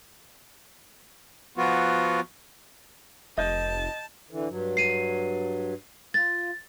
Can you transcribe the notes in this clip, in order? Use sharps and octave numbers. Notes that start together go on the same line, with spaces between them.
F3 B3 F4 F#4
F1 D#5 A5 G6
D3 E3
G2 F#3
C7 D#7
F4 A6